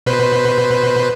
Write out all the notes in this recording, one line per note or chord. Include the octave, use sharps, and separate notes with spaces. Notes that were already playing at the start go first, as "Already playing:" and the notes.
B2 B4 C5